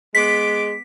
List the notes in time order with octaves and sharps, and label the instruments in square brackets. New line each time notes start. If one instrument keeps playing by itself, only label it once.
[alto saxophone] G#3 [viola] B3 D6 [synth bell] B6